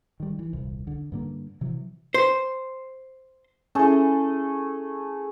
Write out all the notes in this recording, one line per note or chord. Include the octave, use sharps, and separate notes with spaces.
D#3 G3
E3
D#1 C2
D3
G2 D3 A#3
C3 E3 F#3
C5
A3 C#4 E4 G#4 A4